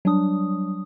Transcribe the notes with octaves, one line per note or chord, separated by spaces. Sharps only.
F#3 G3 D4 D#6